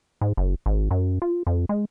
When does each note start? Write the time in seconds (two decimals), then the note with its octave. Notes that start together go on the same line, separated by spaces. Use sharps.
0.21 G#2
0.37 F#1
0.66 G#1
0.91 F#2
1.22 F4
1.47 F2
1.69 G#3